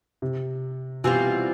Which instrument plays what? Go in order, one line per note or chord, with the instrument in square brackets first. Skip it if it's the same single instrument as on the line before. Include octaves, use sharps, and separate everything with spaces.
[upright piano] C3
[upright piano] B2 [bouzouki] E3 G3 C4 F4